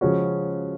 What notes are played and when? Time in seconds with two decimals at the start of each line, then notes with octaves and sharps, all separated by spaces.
0.01 C#3 F3 G#3 C#4 F#4